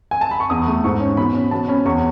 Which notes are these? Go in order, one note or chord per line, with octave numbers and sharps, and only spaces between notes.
G#5
A5
B5
C#6
E2 D#6
A3
G#2 C#6
C#4
B2 B5
C#4
B2 A5
C#4 B5
E2 C#6